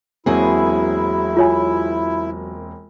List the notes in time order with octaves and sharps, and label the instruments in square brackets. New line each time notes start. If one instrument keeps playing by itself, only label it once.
[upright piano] E1 A#3 C4 [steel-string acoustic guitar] F#3 G#4 [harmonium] E4
[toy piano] F4 C#5 G#5